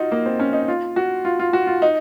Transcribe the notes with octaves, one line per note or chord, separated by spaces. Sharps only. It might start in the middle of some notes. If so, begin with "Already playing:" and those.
Already playing: D#4 F4 F#4
A#3
C4
C#4
D#4
F4
F#4
F4
F4
F#4
F4
D#4